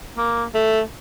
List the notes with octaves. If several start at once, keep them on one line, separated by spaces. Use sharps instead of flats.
A#3
A3